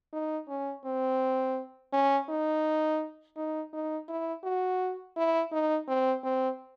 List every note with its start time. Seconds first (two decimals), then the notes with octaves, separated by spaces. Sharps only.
0.13 D#4
0.48 C#4
0.85 C4
1.93 C#4
2.29 D#4
3.37 D#4
3.73 D#4
4.09 E4
4.44 F#4
5.17 E4
5.52 D#4
5.88 C4
6.24 C4